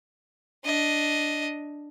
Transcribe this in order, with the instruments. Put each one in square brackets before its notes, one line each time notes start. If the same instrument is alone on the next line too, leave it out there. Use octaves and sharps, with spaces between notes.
[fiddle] D4 D#5